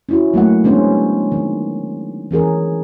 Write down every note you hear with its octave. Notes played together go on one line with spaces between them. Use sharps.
C#4 E4 F#4
F#3 A3 A#3 F#5
D3 G#3 B3 C#4 D4 C5
D#3
E3 C#4 G#4 A#4